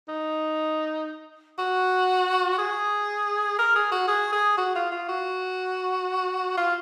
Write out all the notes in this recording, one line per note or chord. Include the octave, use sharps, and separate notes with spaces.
D#4
F#4
G#4
A#4
G#4
F#4
G#4
G#4
F#4
F4
F4
F#4
F4